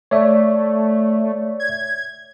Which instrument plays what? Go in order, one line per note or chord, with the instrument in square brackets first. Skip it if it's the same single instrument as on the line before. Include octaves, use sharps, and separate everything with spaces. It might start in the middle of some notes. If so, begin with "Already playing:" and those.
[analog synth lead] A3 [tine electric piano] C#5 D5 E5
[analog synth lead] G#6